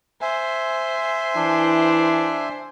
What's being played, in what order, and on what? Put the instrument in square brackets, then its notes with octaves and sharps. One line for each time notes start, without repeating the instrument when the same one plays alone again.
[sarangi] C5 [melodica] E5 G#5
[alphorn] E3 [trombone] D4